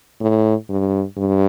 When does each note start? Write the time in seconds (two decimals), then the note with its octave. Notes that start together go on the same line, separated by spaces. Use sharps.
0.21 A2
0.70 G2
1.18 G2